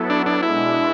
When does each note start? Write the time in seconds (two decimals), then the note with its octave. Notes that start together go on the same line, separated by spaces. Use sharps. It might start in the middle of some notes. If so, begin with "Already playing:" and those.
Already playing: F#3 B3 E4 A4
0.10 D4
0.26 D4
0.43 B2 G#3 D4 E4